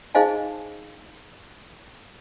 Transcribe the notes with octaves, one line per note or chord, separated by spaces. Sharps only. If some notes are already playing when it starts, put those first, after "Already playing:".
D#4 G#4 C5 D#5 F5 G#5